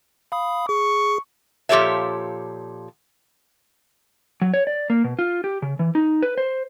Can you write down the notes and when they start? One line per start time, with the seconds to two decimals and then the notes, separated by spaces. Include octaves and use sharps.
0.32 F5 B5 D#6
0.69 G#4 C#6
1.69 A#2 F3 G4 A4 C#5 E5
4.42 F#3
4.54 C#5
4.67 D5
4.90 A#3
5.04 B2
5.19 F4
5.44 G4
5.62 C#3
5.79 E3
5.95 D#4
6.23 B4
6.38 C5